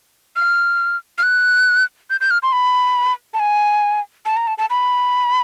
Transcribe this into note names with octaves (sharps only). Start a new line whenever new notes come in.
F6
F6
F#6
G6
G6
F6
C6
B5
A5
G#5
A5
A#5
A5
A5
B5